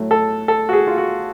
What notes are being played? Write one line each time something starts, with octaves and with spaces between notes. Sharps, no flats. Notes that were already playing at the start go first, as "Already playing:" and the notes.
Already playing: A2 F#3 A3
A4
A4
F#4
G#4
F4
F#4